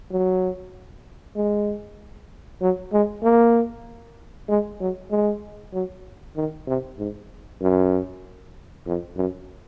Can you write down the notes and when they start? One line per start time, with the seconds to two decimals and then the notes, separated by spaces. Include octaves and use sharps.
0.12 F#3
1.36 G#3
2.61 F#3
2.93 G#3
3.23 A#3
4.49 G#3
4.81 F#3
5.11 G#3
5.73 F#3
6.36 D#3
6.67 C3
6.99 G#2
7.62 F#2
8.87 F2
9.17 F#2